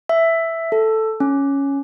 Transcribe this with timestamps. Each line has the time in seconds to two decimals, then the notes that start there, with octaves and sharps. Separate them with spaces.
0.09 E5
0.72 A4
1.20 C#4